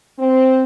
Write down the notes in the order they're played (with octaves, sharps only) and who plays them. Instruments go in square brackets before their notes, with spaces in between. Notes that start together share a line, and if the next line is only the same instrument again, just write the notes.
[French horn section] C4